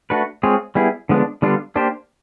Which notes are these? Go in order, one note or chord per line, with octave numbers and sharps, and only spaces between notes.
A3 D4 F#4 B4
G#3 C4 F4 G#4 C#5
G3 B3 E4 G#4
D3 F3 G#3 B3 D4
D3 G3 B3 D4 F4
A#3 D4 G4 C5